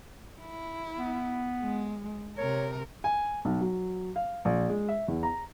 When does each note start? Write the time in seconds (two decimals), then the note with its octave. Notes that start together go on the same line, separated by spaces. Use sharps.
0.40 E4
0.98 B3
1.61 G#3
2.38 C3 A#4 C#5
3.04 G#5
3.45 B1
3.61 F#3
4.16 F5
4.45 A#1
4.69 G#3
4.89 E5
5.08 E2
5.23 A#5